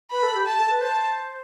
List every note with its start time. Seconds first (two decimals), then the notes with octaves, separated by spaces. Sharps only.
0.11 B4 B5
0.23 A4
0.35 G4
0.46 A5
0.58 A4
0.70 B4
0.81 C5 A5